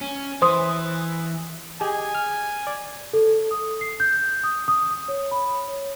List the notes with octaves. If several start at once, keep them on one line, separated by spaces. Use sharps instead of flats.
C#4
E3 C5 C6 D#6
G4 G#4 D#5 G#5
F6
D5
A4
D#6
C7
G6
D#6
D#6
D#6
C#5
B5
C#5